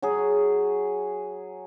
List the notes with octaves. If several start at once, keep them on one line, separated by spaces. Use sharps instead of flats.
F#3 F#4 G#4